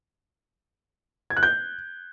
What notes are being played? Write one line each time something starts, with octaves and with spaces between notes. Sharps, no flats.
G#6
F#6
G6